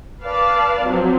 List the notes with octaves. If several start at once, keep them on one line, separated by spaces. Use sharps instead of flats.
B4 D5 F5 A5
F3 F#3 C4